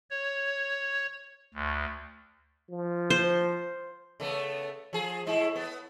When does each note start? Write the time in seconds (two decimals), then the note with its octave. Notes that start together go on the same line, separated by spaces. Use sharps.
0.10 C#5
1.54 D2
2.70 F3
3.10 C5
4.20 C#3 A3 B3
4.93 F3 G#4
5.26 A2 G#3 E4
5.56 B3